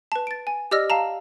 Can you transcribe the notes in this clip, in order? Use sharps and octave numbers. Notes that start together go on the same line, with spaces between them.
B4 A5
A6 D7
G#5
G4 D5 D#5 E6 F6 A#6
F5 A5 A#5